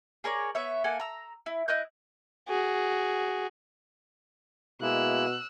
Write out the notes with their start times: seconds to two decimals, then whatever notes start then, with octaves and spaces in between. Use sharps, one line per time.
0.24 G#4 A#4 C#5 D5
0.55 B3 C#5 E5
0.84 A#3 A4 F#5 G#5
1.00 A#5 E6
1.46 E4
1.68 E4 D#5 F#6 G6
2.49 F#4 G#4
4.81 B2 G#3 A#3 E4 E6 F#6